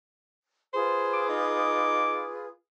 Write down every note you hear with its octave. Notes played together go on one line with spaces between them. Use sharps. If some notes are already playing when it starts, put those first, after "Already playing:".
F4 G#4 B4 C5
D6
D#4